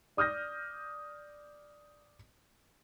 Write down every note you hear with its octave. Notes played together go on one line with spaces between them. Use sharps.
D5 D#6 F6 G6 A#6